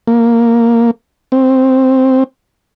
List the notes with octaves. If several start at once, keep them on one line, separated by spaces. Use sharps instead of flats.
A#3
C4